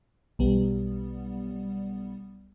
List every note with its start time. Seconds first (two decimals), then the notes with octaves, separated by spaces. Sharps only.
0.39 B1 G3 B3